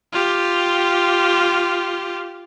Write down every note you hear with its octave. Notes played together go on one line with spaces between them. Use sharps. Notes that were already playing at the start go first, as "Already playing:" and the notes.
F4 G4